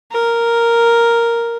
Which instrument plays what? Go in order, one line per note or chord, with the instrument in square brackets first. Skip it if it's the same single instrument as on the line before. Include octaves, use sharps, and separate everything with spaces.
[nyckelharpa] A#4